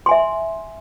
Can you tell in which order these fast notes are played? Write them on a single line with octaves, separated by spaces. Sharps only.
C6 G#5 E5